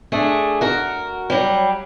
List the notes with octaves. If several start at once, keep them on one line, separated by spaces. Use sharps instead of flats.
A3 D4 G#4
F#4 A#4
F#3 G3